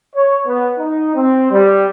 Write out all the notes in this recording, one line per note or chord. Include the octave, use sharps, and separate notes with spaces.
C#5
B3
D#4
C4
G3